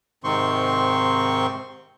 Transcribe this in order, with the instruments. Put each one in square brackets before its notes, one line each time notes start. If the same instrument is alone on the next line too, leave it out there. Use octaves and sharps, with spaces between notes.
[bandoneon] G#2 C3 D#3 C4 C6 C#6